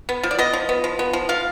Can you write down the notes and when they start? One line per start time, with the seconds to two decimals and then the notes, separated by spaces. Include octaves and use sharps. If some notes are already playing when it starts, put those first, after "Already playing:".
0.09 B3
0.23 F3
0.31 D5
0.39 B3 D#5
0.53 F3
0.69 B3
0.84 F3
0.99 B3
1.13 F3
1.29 F3 F5